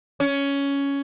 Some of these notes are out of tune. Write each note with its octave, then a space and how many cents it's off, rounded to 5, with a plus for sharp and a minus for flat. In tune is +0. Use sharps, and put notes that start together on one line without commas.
C#4 +10